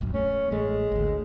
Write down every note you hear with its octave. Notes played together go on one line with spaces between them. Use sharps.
D1 A#1 F#2
A3 C#4
A1 G#3 A3
G#1 D2